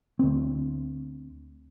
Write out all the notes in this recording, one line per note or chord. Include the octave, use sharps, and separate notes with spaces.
D2 C4